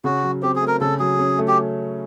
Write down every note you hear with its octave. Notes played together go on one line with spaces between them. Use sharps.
C#3 F#4
F#3
C4 G4
G#4
A3
A#4
C#3 A4
F#3 G#4
C#4
A3
G4